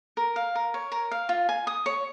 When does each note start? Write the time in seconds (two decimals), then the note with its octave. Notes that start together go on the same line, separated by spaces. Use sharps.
0.17 A#4
0.36 F5
0.55 A#4
0.74 C#5
0.92 A#4
1.11 F5
1.29 F4
1.49 G#5
1.67 D#6
1.86 C#5